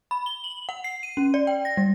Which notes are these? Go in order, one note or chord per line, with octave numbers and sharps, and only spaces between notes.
B5
G7
F#7
F#5
C7
D#7
C#4
D5
G5
A#6
G3